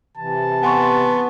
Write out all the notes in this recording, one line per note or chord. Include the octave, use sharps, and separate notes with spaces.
C3 E3 A5
B3 G#5 C6 C#6